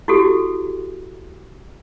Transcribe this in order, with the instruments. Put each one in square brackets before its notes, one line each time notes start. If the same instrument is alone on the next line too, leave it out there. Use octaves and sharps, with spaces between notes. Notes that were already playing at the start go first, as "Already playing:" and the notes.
[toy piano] E4 F#4 G4 A4